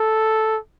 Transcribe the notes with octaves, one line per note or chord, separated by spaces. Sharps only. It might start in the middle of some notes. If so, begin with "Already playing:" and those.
Already playing: A4